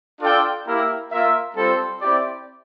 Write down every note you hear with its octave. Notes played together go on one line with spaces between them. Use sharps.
D4 F4 A4 D5 G5
A#3 E4 G4 A#4 E5
A#3 F4 A#4 E5
G3 C4 F4 A4 C5
C4 E4 G4 D5